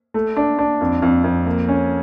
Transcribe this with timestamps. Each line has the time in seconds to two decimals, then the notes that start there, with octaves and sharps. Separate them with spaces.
0.14 A3
0.37 D4
0.59 D4
0.81 F2
1.02 F2
1.24 F2
1.46 A#3
1.68 C#4